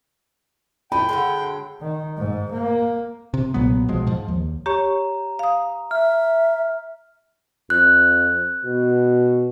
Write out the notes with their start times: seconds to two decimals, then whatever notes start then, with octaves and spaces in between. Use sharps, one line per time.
0.92 A#2 G5 G#5 B5
1.09 D3 F#3 G#3
1.81 D#3
2.17 G#2
2.52 A#3
3.34 C3
3.54 B1 A#2 F#3 B3
3.88 D1 B2 F3 G#3
4.07 G#2 F3
4.28 D#2
4.66 G4 C#5 A#5 C#6
5.39 F5 D#6
5.91 E5 F6
7.70 F2 F#6
8.65 B2